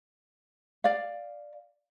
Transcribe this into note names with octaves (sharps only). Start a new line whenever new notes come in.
D5 F5